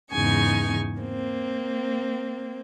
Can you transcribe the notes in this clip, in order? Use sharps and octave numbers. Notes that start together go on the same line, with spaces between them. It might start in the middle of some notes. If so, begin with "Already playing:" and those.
E2 G#2 C#3 D#4 G#5 C#6
A#3 C4